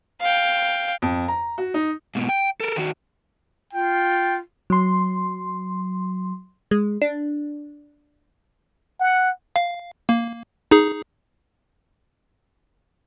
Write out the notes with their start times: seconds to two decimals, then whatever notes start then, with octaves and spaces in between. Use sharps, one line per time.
0.21 F5 G5
1.02 F2
1.28 A#5
1.58 F#4
1.74 D#4
2.15 G#2 B2
2.29 G5
2.60 A4 A#4
2.77 D#3 F#4
3.73 F4 G5
4.70 F#3 C6
6.71 G#3
7.02 D4
9.00 F#5
9.56 F5
10.09 A#3
10.71 D#4 G#4